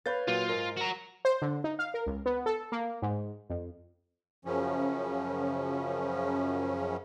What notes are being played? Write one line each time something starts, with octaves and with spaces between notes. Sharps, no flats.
B4 C#5 F5 B5 G6 A6
A#2 F#3 F4
G#2 A#4
F#4 A#5
C5
D3
D#4
F5
A#4
C#2
B3
A4
A#3
G#2
F2
F#2 C#3 F3 C#4